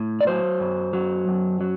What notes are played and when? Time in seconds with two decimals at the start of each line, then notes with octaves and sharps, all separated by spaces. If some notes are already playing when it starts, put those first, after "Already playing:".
Already playing: A2
0.21 D5
0.27 F#3 C5
0.60 F#2
0.93 F#3
1.28 F#2
1.61 F#3